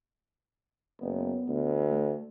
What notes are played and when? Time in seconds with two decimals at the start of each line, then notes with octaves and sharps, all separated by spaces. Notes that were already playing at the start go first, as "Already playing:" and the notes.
1.01 F#1 B3
1.48 D2
1.91 A3